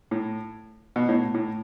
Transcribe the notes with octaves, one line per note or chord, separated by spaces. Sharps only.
A2
B2
A2
A2